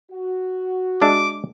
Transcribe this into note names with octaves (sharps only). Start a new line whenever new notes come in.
F#4
G#3 D4 E5 D6